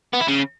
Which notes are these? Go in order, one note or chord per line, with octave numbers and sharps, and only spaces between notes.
B3
E4
C#3